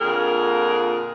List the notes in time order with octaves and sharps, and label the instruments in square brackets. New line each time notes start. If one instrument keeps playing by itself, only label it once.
[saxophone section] F2 A#2 D3 F4 G#4 A#4